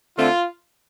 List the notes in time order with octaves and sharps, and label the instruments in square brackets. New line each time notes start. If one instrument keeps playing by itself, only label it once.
[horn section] D3 A3 C4 F4